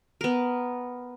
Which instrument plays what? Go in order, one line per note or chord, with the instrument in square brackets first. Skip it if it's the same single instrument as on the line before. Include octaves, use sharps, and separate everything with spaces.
[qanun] B3 A#4